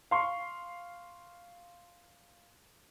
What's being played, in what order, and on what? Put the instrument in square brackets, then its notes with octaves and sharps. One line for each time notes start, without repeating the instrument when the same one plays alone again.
[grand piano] F5 C6 C#6